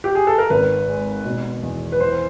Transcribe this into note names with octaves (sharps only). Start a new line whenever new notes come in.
G4
G#4
A4
A#4
G#1 B4
G#3
B2
E2
B4
E3 C5